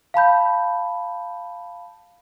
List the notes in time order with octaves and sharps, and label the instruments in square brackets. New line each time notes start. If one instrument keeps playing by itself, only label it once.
[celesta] F5 A5 B5 G6